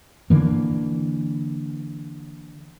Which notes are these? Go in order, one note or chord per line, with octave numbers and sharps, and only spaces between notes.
D3 E3 A#3